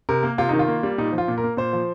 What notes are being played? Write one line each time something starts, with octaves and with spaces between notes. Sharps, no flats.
C3 A#4
A#3
C3 F4
D#3 D#4
F4
A#3
G3
A#2 D#4
F3
F4
A#2
A#4
A#3
A#2 C5
F3